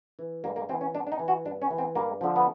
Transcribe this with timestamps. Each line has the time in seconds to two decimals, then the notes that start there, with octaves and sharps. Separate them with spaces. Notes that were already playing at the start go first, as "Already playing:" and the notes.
0.19 E3
0.44 G2 A#3
0.56 A#3
0.69 E3 C4
0.81 C#4
0.94 G2 D4
1.07 D4
1.12 D#4
1.19 E3
1.28 F#4
1.45 G2 D4
1.62 C#4
1.71 E3
1.78 C4
1.95 G2 A#3
2.21 D3 F3
2.36 B3